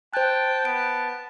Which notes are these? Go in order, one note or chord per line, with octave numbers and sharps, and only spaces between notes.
C5 G5 A5 F#6
B3 D7